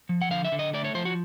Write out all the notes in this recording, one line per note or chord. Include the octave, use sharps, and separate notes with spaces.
F3
F#5
D3 F5
E5
D3
D#5
A3 D5
C#5
F3 C5
F#4